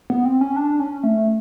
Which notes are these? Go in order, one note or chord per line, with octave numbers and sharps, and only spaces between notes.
B3
C4
C#4
D4
C#4
A3